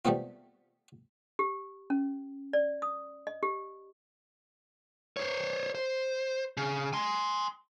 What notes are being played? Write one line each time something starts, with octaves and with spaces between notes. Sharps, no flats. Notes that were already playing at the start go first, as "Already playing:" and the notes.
G3 A3 B3 C4 F4
G4
C#4
D5
D#6
D#5
G4
C5 C#5
C5
C#3
G#5 C6